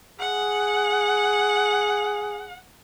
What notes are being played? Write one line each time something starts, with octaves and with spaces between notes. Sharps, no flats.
G#4 F#5